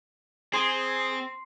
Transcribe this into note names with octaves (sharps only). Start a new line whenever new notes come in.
C4 G#4 C6 C7